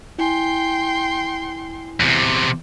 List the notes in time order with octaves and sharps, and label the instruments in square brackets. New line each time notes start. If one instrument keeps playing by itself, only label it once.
[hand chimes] E4 G#5 [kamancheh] G5 C6
[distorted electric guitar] E2 C3